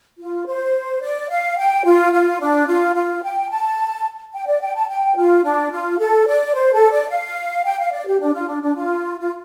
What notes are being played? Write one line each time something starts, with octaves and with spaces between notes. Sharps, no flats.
F4
C5
D5
F5
G5
F4
F4
D4
F4
F4
G5
A5
G5
D5
G5
A5
G5
F4
D4
F4
A4
D5
C5
A4
D5
F5
G5
F5
D5
G4
D4
F4
D4
D4
F4
F4